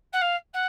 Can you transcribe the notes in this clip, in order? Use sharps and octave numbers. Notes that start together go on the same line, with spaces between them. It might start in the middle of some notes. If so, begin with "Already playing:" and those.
F#5
F5
F#5